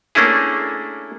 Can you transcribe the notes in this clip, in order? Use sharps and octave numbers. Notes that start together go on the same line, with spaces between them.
A3 A#3 C#4 D4 E4 G#4